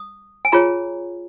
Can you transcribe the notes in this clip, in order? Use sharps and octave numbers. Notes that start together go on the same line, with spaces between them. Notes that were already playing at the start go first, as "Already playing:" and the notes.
Already playing: D#6
G#5
F4 G#4 C#5 A#5